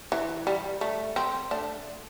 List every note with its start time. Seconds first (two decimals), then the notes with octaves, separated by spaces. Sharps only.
0.12 E3
0.47 G3
0.81 A3
1.16 C4
1.51 A3 D4